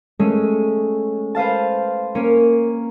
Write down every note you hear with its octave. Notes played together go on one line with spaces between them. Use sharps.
G#3 A3 C#4
B4 C5 F5 A5
A#3 C#4 C#5